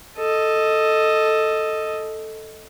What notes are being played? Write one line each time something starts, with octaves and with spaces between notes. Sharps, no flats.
A4 D#5